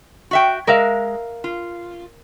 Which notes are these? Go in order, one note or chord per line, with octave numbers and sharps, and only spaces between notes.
F#4 E5 G5
G#3 A#4 E5 F5
F4